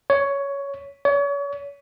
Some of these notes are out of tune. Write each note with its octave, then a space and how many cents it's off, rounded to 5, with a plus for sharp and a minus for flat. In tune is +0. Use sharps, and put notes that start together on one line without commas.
C#5 +10
C#5 +35